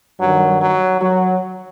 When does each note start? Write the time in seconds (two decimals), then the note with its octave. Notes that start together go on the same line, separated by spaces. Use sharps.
0.21 G2 D#3 F#3
0.62 F#3
1.01 F#3